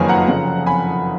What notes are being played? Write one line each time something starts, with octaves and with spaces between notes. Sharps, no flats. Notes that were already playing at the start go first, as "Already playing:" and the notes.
Already playing: F#1 F2 D#3 A#3 B4 C#5 F5 G#5
F#5 A#5
F1 F2 C#3
G#5 B5